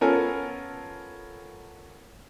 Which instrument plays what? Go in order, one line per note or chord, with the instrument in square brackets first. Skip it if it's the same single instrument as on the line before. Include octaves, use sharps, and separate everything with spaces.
[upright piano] B3 C#4 F4 A4 A#4 G#5